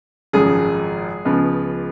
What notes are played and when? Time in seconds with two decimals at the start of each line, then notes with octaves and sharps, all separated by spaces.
0.33 G#1 F#2 C#3 F3 G#3 G#4
1.25 C#2 C#3 F3 G#3 B3